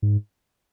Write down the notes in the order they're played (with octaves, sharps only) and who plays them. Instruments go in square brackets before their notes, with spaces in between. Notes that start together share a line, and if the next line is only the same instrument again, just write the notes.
[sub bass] G#2